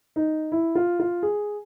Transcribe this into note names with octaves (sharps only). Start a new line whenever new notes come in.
D#4
E4
F4
F4
G#4